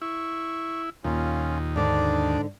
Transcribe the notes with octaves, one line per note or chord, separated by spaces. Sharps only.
E4 C#6
D#2 A#2 C#4 F4
G#2 D3 D4 D5